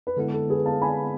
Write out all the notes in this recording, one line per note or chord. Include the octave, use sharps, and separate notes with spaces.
B4
D3 G#3 B3 E4 A4
A4
G#4 B4
F5 A5
G#5 B5